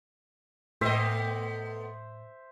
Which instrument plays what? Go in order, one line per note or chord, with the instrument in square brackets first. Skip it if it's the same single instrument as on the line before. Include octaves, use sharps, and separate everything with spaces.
[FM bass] A2 [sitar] A3 B3 D#5 [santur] C5 E5